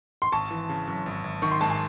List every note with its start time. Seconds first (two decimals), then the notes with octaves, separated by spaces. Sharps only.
0.22 C6
0.32 G#1 A5 C#6
0.51 E3
0.69 C#3
0.87 F#2
1.06 G#1
1.24 G#1
1.42 D#3 C#6
1.51 C6
1.61 G#2 A5
1.70 G#5